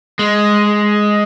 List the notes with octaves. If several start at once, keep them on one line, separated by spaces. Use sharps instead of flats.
G#3